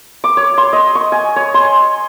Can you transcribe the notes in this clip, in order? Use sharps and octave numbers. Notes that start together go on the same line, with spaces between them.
D6
C#5
C6
D#5
C#6
G#5
C#5
C6